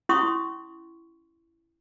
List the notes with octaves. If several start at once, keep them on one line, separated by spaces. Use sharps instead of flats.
C#4 E4 C6 C#6 D#6